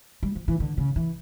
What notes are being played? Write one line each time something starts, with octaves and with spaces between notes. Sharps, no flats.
G3
F3
E3
D3
C#3
E3